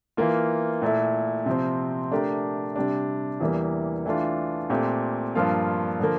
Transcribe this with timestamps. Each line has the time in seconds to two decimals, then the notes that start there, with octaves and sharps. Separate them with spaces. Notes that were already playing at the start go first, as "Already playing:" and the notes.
0.17 E3 A#3 F4
0.82 A#2 A3 E4
1.46 C3 F3 C4
2.11 A3 D4 G4 A#4
2.76 C3 G3 D4
3.40 E2 E3 G3 A#3
4.06 E3 A3 D4 F4
4.70 A#2 A3 C4 G4
5.35 G2 F3 A#3 F4
5.99 D3 F3 A#3